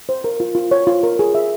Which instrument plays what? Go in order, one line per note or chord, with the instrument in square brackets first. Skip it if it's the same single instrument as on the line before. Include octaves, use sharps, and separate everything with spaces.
[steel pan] C5
A#4
F4
F4
C#5
F4
A#4
G#4
E5